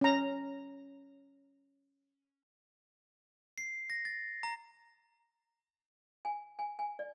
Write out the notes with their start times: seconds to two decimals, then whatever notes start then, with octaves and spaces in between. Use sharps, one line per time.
0.01 C#4 A#5
3.58 C7
3.90 A#6
4.05 A6
4.43 A#5
6.25 G#5
6.59 G#5
6.79 G#5
6.99 D5